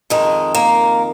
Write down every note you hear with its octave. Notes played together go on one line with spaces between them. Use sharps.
F2 D#3 G#3
A#3